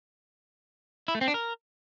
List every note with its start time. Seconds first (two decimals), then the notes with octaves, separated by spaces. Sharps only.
1.08 E4
1.15 A3
1.21 C4
1.28 D4
1.34 A#4